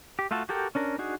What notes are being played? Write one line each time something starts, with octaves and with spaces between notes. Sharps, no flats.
G4
A3 F4 F#4 A4
F#4 G4 A4 A#4 G5
C#4 D4 A#4
D4 D#4 F#4 G#4